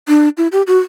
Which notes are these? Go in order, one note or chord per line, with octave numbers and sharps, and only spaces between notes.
D4
E4
G4
F#4